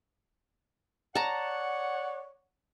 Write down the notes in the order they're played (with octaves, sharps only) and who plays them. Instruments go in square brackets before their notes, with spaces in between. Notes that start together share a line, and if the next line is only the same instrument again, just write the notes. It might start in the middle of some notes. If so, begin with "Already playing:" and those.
[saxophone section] C#5 D5 F#5 [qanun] A5 A#5